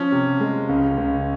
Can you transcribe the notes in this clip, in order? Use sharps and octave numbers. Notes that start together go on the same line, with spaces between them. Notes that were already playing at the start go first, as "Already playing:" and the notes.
Already playing: F3 C#4
C3
G#3
C#2
C#2